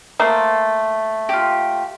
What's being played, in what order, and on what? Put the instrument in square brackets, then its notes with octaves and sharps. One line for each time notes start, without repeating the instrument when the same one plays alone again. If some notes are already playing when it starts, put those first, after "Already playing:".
[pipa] A3 A#3 [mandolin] C5
[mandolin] F4 G4